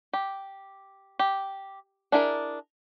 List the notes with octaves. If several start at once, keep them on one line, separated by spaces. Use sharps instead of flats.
G4
G4
D4 E4 G#4 A#4